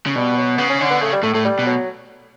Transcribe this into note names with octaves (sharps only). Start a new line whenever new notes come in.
C#3
B2 G3
F#3
C#3 B3
C#4
D3 C#4
B3
C#3 A3
G3
A2 A3
A2 A3
G3
B2
F#3